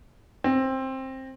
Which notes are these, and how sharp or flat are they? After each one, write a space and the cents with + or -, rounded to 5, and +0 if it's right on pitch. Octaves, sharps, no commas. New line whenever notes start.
C4 +15